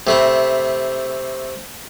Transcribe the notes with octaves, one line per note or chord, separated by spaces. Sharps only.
C3 A3 B5